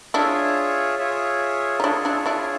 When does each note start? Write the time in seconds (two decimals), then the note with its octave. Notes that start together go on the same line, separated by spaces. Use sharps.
0.14 D4 E4 F4 G#4 C#5 E5
0.99 F4 G#4 C#5 E5
1.80 D#4
1.83 D4 E4 F4 G#4 C#5 E5
2.05 D4 E4
2.26 D4 E4